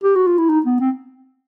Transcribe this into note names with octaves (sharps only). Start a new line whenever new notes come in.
G4
F#4
F4
E4
D#4
B3
C4